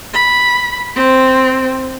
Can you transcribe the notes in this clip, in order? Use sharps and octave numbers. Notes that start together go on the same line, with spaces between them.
B5
C4